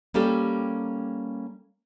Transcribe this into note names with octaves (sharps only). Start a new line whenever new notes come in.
G3 A#3 C#4 G4 A4